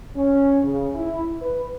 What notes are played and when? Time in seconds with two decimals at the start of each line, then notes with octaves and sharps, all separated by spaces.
0.16 C#4
0.63 C#3
0.95 E4
1.41 B4